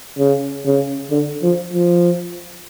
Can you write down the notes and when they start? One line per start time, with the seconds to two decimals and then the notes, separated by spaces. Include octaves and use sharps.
0.18 C#3
0.65 C#3
1.11 D3
1.42 F3
1.73 F3